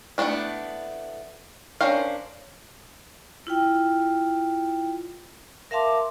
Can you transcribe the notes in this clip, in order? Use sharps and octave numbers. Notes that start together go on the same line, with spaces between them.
A3 B3 C4 D4 E4
C#4 D4 A#4 C5 F5
E4 F4 G5
A#4 E5 F5 A5 C6 D6